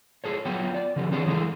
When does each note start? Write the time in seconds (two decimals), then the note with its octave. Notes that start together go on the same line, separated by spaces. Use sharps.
0.24 F4 G#4 A4 C#5
0.45 F#3 B3 F4 C#5 G5
0.74 D5
0.96 C#3 F3 C#4 G4 A4
1.11 E3 C4 D4 F4 G#4 C#5
1.26 E3 G#3 A3 C4 G#4 A4